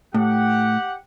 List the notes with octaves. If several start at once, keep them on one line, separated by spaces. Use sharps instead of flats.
A2 G4 F#5